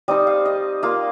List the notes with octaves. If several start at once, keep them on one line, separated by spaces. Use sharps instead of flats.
G3 C4 D#4 D#5
F5
D#5
A#3 F4 F5